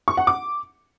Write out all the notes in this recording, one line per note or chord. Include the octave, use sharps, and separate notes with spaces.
C#6
F#5
D6